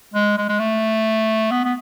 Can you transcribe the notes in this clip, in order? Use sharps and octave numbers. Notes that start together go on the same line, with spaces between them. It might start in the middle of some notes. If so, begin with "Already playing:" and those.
G#3
G#3
G#3
A3
B3
B3